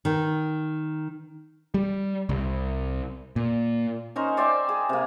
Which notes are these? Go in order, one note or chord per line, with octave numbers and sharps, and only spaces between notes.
D#3
G3
C2
A#2
C#4 D#4 A#4 C5
C5 D5 E5 G5
G#4
C3 A#3